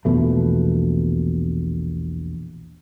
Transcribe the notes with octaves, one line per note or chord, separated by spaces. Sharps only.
A#1 E2 B2 A3